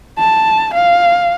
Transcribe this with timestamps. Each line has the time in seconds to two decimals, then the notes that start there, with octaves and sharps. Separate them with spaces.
0.19 A5
0.74 F5